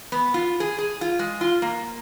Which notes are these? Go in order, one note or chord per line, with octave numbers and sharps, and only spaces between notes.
B3
F4
G#4
G#4
F4
G#3
F4
A#3